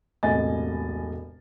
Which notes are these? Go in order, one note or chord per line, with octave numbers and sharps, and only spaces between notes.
E1 C2 A2 D#5 G#5 A6